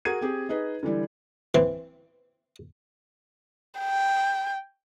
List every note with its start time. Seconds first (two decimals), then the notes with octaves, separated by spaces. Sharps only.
0.05 F#4 G#4 A#4 G#6 D#7
0.22 C4 G4 G#4
0.49 D#4 G#4 B4 D#5
0.83 D3 E3 G3 E4
1.55 E3 C4
3.80 G5